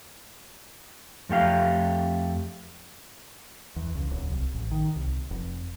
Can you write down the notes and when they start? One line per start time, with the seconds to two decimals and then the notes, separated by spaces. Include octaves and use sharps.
1.29 F2 A3 G4 F5
3.76 E2
3.95 C#2
4.11 D1
4.31 C2
4.54 A1
4.71 D#3
4.96 C2
5.31 F1